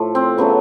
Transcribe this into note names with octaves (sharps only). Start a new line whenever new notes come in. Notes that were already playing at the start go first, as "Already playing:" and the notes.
Already playing: A2 F3 A3
C4
C#3 F#3 A3 B3